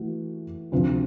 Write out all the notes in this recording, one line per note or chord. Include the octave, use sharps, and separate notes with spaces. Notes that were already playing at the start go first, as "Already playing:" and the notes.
Already playing: E3 A3 F#4
D2 C3 F3